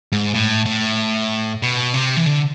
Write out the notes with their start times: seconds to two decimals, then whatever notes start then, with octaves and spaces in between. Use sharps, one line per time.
0.12 G#2
0.34 A2
0.66 A2
1.62 B2
1.94 C3
2.17 E3
2.26 D3